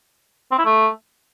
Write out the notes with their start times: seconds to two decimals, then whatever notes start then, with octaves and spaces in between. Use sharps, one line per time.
0.51 C4
0.58 E4
0.65 A3